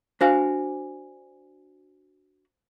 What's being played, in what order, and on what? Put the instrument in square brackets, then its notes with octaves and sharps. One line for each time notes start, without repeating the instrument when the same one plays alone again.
[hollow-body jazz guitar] D4 F#4 F5 [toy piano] C5 G#5